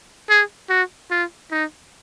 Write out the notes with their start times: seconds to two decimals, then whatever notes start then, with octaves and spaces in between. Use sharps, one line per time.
0.29 G#4
0.70 F#4
1.11 F4
1.51 D#4